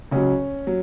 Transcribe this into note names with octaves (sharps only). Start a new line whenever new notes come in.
C#2 C#3 F#3 C#4
F#3